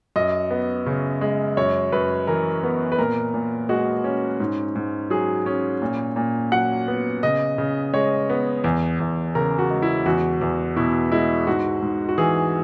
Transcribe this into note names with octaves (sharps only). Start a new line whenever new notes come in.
F#2 D#5
B3
C#3
G#3
F#2 C#5
F#2 B4
E3 A#4
B3
B4
A#2 A#4
A#2
G#3 F#4
C#4
G#2
G#2
F#3 G#4
C#4
A#2
A#2
F#3 F#5
B3
C#3 D#5
C#3
G#3 C#5
B3
E2
E2
C#3 A#4
F#4
G#3
E4
E2 F#4
E2
B2 E4
G#3 E4
G#2 F#4
G#2
F#4
E3 G#4